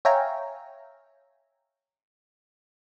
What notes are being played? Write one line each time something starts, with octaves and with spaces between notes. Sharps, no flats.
C#5 E5 F5 G5 G#5 A#5